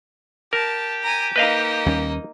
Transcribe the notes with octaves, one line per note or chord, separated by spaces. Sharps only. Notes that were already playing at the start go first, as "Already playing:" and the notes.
G4 A#4 A5
G#5 A#5
A#3 D#4 B4 D#5 F5
D#2 G3 C#4